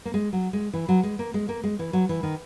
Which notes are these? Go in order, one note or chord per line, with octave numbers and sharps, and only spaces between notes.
A#3
G#3
F#3
G#3
E3
F#3
G#3
A#3
G#3
A#3
G#3
E3
F#3
E3
D#3